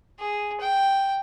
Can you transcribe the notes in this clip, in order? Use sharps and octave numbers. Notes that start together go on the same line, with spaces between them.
G#4
G5